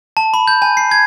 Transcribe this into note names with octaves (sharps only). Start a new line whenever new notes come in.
A5
B5
G6
G#5
C7
G#6